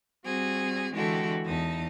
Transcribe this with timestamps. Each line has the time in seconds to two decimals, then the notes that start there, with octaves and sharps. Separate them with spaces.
0.24 G3 C4 F#4 G#4
0.93 D3 E3 G#3 F#4 G4 A4
1.45 E2 D#4 A5